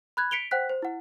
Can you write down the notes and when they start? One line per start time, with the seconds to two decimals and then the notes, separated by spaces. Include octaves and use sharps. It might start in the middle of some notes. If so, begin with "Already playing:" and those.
0.17 B5 F#6 G#6
0.31 B6 C#7 D7 F7 G7
0.51 C5 F#5 G5 F#6 B6
0.69 C5
0.82 E4 F#5